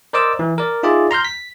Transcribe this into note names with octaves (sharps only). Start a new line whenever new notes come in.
A#4 C5 D5 D#5 D6 E6
E3
A#4 D5
D#4 F4 G#4 D5 E5
A#5 C6 F6 G6
B6